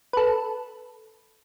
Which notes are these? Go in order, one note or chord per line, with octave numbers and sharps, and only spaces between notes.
A4 B4